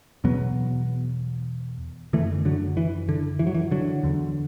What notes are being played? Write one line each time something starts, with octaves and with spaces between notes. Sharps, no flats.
E2 B2 F#3 B3
F#2 D3 E3 A3
D3 F#3
E3
D3
E3
F#3
E3
D3 F#3
E2 D3